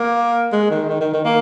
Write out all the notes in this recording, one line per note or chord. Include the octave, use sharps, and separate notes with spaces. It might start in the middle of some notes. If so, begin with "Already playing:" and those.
Already playing: A#3
G#3
D#3
D#3
D#3
D#3
A#3